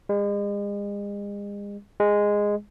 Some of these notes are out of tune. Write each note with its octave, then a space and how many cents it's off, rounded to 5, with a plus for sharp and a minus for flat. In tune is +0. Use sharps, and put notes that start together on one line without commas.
G#3 -40
G#3 -10